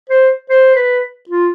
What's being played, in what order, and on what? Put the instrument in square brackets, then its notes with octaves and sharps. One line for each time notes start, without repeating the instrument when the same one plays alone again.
[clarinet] C5
C5
B4
F4